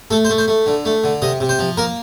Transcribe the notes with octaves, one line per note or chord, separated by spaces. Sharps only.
A3 A4
C5
A3
C5
A3
D3
A3
D3
C3 D#5
C3
C5
F3
A#3 A#4